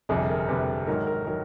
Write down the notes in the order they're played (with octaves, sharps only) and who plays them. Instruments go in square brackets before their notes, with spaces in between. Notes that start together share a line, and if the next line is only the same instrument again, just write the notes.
[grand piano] G1 F2 C3 [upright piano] G#4
[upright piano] A#4
[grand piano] G1 F2 C3 [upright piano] B4
[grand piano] G#2 D#3 F#3 [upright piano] A#4
[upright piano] A#4
[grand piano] D#3 F#3 [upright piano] A#4